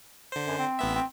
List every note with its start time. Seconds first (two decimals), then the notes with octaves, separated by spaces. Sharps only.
0.32 D3 C5
0.47 F#2
0.58 C4
0.79 A1 B3 E5
0.95 C4